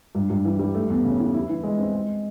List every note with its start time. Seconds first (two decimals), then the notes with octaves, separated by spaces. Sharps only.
0.15 G2
0.30 G2
0.45 E3
0.59 G3
0.74 A3
0.90 E2
1.05 C#3
1.19 E3
1.34 E4
1.49 E3
1.63 G#3
1.79 C4
1.93 G#3